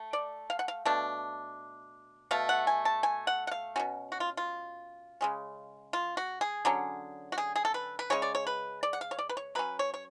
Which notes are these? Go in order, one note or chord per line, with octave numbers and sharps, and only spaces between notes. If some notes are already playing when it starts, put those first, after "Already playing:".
Already playing: A3
D5
F5
F#5
F5
B2 A3 D4
B2 A3 F5
F#5
G#5
A5
G#5
F#5
F#5
F5
B2 G#3 C#4 F#4
F#4
F4
F4
C#3 G#3 C#4
F4
F#4
G#4
D3 F#3 C#4
F#4
G#4
G#4
A4
B4
B4
C#3 G#3 C#4 C#5
D5
C#5
B4
D5
F#5
F5
C#5
D5
B4
C#5
F#3 C#4 B4
C#5
C#5